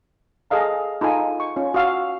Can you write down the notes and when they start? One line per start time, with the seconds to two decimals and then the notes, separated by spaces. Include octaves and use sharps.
0.50 G#4 A4 D#5 F5 A#5
1.01 D#4 F4 A4 G#5
1.40 C#6
1.56 C#4 F4
1.74 F#4 F5 E6